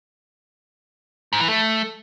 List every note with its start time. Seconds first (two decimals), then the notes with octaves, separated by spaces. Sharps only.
1.33 G#2
1.40 E3
1.48 A3